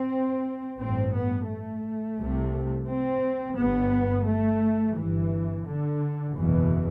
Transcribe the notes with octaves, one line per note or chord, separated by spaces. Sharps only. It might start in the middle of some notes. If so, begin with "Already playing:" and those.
Already playing: C4
A1 G2 C4
B3
A3
C2 C3
C4
G1 G2 B3
A3
G1 G2 E3
D3
F#1 E2 B2 E3